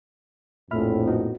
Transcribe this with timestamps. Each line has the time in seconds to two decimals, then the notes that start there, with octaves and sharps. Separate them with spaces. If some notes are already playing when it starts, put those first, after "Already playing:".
0.71 A#1 F2 A2 E5 B5 F6
1.07 B3 D#4 F#4